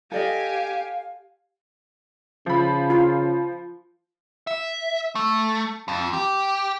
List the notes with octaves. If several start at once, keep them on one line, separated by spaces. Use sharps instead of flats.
G4 A4 D5 D#5 F5 G#5
C#3 F3 B5
F4
E5
A3
F2
G4